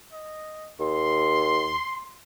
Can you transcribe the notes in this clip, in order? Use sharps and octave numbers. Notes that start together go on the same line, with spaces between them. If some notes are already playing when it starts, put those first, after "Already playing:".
D#5
D#2 C6